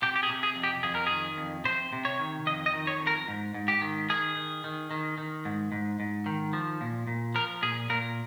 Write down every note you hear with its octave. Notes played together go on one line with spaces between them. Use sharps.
C3 G4
G4
G#4
C3
G#4
F2
G4
F2 G#4
A#4
D#3 G#4
F2
C3 C5
C3
C#5
D#3
F2 D#5
D#5
D#3
C#5
F2
A#4
G#2
G#2
G4
D#3
D#3 G#4
D#3
D#3
D#3
D#3
G#2
G#2
G#2
D#3
F3
A#2
A#2
F3 A#4
A#2 G#4
A#2 A#4